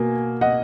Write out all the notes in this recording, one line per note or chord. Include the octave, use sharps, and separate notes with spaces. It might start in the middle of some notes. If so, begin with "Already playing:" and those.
Already playing: B2 A#3 G#5
D#5 F#5